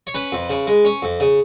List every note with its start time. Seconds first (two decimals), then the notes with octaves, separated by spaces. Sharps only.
0.07 C#5
0.14 C#4 B4
0.32 F2
0.50 C#3
0.67 G#3
0.85 C#4
1.02 F2
1.20 C#3